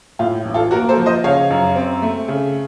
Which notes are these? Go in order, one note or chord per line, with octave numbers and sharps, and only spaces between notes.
A2 F4
A1
F4 A4
A#3 F#4 A#4
A4 C5
F3
C5 D#5
C#3 C#5 F5
F#2
C4
A3
C#3